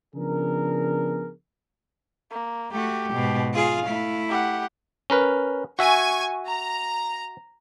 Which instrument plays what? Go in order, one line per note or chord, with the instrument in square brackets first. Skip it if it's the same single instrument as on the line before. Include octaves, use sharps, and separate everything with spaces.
[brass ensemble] C#3 F3 B3 D4 G#4 A#4
[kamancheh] A#3
[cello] A3 F#4 [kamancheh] G4
[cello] G#2 B2
[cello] F4 G#4 [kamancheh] F5
[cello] A3 E4
[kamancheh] G4 F#5
[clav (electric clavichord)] C#4 A#4 B4
[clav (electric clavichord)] F#4 E5 [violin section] G#5 C#6 G#6
[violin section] A#5